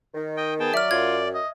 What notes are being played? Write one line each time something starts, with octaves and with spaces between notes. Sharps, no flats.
D#3
D#5 G5
B3 G#4 G5 A5
F#3 D5 E5 F6
F#2 F4 G#6
D#5